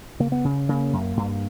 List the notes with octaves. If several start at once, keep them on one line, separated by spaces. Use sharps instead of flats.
C#3 A#3
B3
C#3
C#3 A#3
F#2
G2